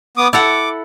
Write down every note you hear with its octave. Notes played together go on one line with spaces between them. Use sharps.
B3 D6 D#6
E4 A4 F#5 D6